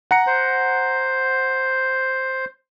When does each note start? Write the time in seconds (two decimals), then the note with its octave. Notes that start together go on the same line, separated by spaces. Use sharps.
0.11 F#5 A#5 C#7
0.27 C5